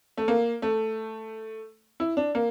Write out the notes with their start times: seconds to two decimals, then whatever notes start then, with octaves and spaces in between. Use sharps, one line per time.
0.17 A3
0.28 A#3
0.62 A3
2.00 E4
2.17 D4
2.35 A#3